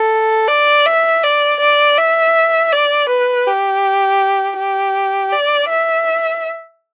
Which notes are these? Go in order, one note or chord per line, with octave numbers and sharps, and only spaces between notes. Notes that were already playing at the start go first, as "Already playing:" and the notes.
Already playing: A4
D5
E5
D5
D5
E5
D5
B4
G4
G4
D5
E5